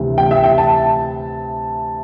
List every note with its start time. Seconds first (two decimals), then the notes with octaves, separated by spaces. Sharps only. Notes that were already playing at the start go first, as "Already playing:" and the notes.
Already playing: D2 C3 E3
0.18 G5
0.31 E5
0.44 G5
0.58 A5